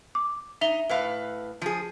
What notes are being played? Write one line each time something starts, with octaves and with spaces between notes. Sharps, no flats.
D6
D#4 E5 F7 G7
A2 B4 F5
F3 G#4